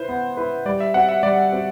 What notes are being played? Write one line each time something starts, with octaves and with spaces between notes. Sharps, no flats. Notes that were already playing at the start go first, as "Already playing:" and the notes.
Already playing: E4 B4 C5
B3
E4 B4
G3 D5
E5
C4 F#4 F#5
E5
G3 D5
C4 F#4